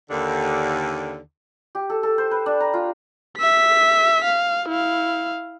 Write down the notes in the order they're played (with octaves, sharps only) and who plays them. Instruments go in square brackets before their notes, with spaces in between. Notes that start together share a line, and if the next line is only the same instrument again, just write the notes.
[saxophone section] D#2 D3
[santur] G4
A4
A4
C5
B4
D4
A#5
F4
[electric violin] E5 B6
F5
E4 F5